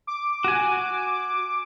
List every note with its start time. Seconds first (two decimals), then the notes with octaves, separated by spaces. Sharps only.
0.07 D6
0.44 F#4 G#5